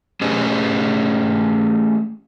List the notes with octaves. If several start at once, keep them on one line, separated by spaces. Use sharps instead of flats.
A3 C#4 G4 G#4 C5 D#5